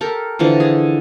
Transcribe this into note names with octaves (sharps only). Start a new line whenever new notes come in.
G4 A4 A#4
D3 E3 F3
G#4